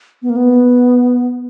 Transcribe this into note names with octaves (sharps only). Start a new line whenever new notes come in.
B3
A#3
B3